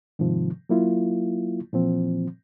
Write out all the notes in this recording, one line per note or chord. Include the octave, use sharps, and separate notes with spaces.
G#2 C3 D#3 F3
F#3 A#3 E4 F4
A#2 E3 F3 C4